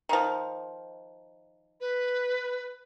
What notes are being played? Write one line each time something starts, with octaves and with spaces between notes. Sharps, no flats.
D#3 F3
B4